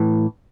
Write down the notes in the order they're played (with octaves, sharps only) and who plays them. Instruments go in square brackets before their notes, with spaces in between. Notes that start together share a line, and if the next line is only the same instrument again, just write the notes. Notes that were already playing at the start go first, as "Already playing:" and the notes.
Already playing: [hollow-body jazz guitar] A2 E3